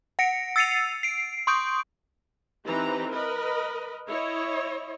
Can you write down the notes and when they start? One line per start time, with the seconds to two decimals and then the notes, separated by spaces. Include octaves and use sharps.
0.19 F#5 A#6 C#7 D7
0.56 E6 A6 C7 C#7 D#7 F7
1.03 C7 D7
1.47 C6 C#6 D#6 G6 D7
2.66 E3 C4 D#4 G4 B4 A#5
3.09 A#4 B4 D#5 B5
4.07 E4 C#5 D#5